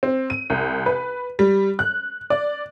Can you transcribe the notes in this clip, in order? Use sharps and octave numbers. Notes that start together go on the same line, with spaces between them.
C4
D#7
C2
B4
G3
F#6
D5